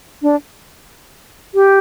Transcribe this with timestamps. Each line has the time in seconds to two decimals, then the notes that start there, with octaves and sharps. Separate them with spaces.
0.22 D4
1.55 G4